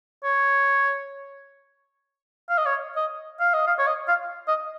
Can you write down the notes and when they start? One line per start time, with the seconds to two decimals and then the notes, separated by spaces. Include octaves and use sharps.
0.24 C#5
2.50 F5
2.58 D#5
2.66 C#5
2.96 D#5
3.40 F5
3.54 D#5
3.67 F5
3.78 C#5
3.87 D#5
4.08 F5
4.48 D#5